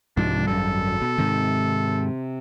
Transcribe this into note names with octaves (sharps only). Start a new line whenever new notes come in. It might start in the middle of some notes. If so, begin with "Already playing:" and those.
C2 G#2 C3 F3 G#3 D4
G#1 F#2 G3 A4
B2
G#2 C3 D#3